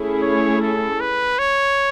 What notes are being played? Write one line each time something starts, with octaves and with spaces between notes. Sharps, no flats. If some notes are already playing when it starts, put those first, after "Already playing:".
Already playing: A3 C#4 E4 G#4
C#5
A4
B4
C#5